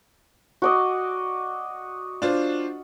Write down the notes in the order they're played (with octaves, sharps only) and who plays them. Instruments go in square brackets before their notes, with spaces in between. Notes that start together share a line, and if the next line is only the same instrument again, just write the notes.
[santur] F#4 D5 D#5
[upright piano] D4 F4 C5